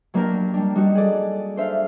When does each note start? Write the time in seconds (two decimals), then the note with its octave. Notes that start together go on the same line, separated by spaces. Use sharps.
0.14 F#3 A#3 D4 G4 A#4
0.54 G3 D4
0.75 G3 D#4 F#4
0.95 G#4 A4 D5
1.56 D4 C5 E5 F5